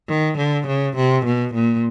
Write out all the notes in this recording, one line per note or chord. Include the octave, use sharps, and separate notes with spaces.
D#3
D3
C#3
C3
B2
A#2